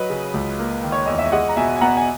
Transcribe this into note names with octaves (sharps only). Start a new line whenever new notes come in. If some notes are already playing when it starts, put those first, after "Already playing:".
Already playing: F#3 B4 D#5
C#3
C#2
A#3
D#3
C#5
E2 D#5
E5
G#3 D#5 F#5
A#5
B2 E5 G#5
G#5
B3 F#5 A#5
G#5